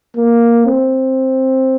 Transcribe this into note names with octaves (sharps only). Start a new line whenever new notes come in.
A#3
C4